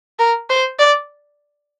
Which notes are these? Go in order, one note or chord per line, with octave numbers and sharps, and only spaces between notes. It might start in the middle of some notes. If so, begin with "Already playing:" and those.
A#4
C5
D5